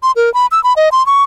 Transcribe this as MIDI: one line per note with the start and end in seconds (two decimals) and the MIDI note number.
0.03 0.12 84
0.16 0.32 70
0.34 0.47 83
0.51 0.62 88
0.64 0.73 83
0.76 0.89 75
0.92 1.05 84
1.06 1.23 85